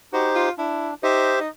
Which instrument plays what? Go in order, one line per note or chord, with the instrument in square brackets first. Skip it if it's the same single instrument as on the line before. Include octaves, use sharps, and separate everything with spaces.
[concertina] D#4 G4 C5 [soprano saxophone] F#4
[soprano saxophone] F4
[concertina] D4 [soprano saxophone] E4
[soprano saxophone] D#4 [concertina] G4 C5 E5
[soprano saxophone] D#4